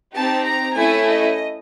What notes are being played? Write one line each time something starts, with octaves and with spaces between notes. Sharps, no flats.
C4 D#4 G4 A5
A#5
A3 C#4 E4 A4 G#5
D#5